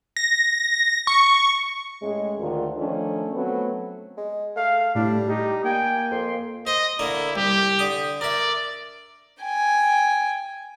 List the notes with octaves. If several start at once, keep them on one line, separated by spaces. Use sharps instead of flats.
A#6
C#6
A2 G#3 A3 C#4 G#4
D2 D#3 F4
D#3 F3 A3 C#4 D4
F#3 A3 B3 C4
G#3
A3 F5
A2 G3 D4
D#4 G4
A#3 G5 G#5
F2 C6
C5 D#5
D3 A#3 E4
C2 G4
D3 D#6
A#4 D5 E5
G5 G#5